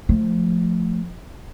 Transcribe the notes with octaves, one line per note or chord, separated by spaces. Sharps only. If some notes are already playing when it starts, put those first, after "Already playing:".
F3 A3